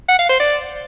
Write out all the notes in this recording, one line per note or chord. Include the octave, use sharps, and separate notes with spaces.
F#5
F5
C5
D5